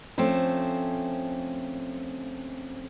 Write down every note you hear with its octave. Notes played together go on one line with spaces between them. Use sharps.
F3 A3 C4 C#4